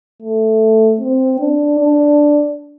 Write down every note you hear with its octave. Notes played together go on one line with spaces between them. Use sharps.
A3
C4
D4
D4